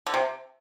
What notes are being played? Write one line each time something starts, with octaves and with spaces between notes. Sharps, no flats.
D3
C3